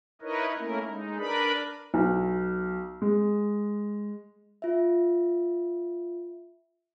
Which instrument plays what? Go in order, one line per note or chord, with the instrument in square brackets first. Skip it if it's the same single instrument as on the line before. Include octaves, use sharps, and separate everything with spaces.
[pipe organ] D#4 E4 A#4 B4 C#5 D#5
A3 A#3 C#4 E4 A#4
G#3 D#4
D4 A#4 B4 D5 B5
[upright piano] B1
G#3
[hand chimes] F4 E5